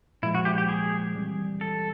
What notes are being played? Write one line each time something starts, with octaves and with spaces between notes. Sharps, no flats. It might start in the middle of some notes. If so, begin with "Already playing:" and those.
A#2 F3 G#3 E4
F#4
G4
G4
G#4
E3 G3 C4
A4